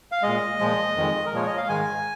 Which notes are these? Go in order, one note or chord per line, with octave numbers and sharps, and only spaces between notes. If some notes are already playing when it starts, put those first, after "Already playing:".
F5
A#2 G#3 D#5
A#2 F3 G#3
F2 D#3 G#3
A#4
A#2 F3 G#3 C#5
D#5
F5
G#2 D#3 G#3 G#5